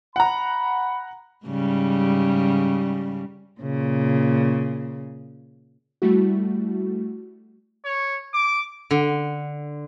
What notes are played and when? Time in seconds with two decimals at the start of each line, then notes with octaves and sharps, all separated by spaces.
0.16 F#5 A#5 B5
1.46 G#2 C#3 G3
3.61 A#2 C#3
6.02 G3 A3 E4 F#4
7.85 C#5
8.34 D6
8.91 D3